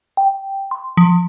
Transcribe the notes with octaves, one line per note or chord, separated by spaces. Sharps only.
G5
C6
F3